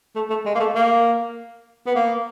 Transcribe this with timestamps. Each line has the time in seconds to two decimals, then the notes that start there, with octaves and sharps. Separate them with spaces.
0.15 A3
0.30 A3
0.46 G#3
0.55 A#3
0.60 A3
0.75 A#3
1.86 B3
1.95 A#3